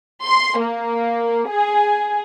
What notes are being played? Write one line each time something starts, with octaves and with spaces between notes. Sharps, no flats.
C6
A#3
G#4